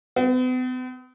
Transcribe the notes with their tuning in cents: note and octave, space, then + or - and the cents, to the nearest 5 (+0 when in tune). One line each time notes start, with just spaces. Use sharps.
B3 +45